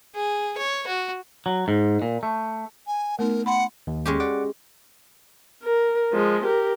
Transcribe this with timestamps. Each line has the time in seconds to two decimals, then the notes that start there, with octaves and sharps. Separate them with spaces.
0.15 G#4
0.58 C#5
0.87 F#4
1.46 F#3
1.68 G#2
2.02 A#2
2.23 A3
2.87 G#5
3.19 A3 B3 D#4 A#4
3.46 F#5 B5 C6
3.87 D#2
4.06 G#3 C#4 G4
4.20 D5 F#5 D6
5.63 A#4
6.12 F3 G#3
6.44 G4 A#4